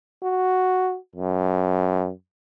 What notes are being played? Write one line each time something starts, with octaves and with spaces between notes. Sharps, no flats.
F#4
F#2